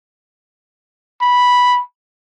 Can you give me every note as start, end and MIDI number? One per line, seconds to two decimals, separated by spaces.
1.22 1.81 83